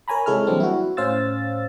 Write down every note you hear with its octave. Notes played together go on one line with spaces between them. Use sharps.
A#4 C#5 G#5 A#5 B5
C3 G#3 E4 A4 C#5 F6
E3 F#3 G3 A#3 C4 D4
E4 F#4
A2 C#4 C5 F5 E6 A6